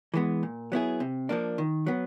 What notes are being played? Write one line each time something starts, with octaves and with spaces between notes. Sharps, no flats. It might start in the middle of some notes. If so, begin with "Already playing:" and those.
E3 G#3 B3
A#2
F#3 B3 E4 G#4
C3
F3 A#3 D4
D#3
F#3 B3